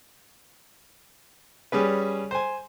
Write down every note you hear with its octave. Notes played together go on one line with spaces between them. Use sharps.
G3 C#4 G#4 B4
C5 G#5